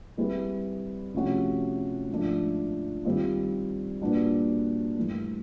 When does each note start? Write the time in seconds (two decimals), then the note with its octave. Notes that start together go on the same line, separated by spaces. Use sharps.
0.17 G3 C4 E4 G#4 B4
1.14 C3 F3 A3 C#4 F#4
2.09 G#2 F3 A3 D4
3.05 D#3 G3 C4 F4
4.02 A#2 G3 B3 D4 F#4
4.96 G2 E3 A3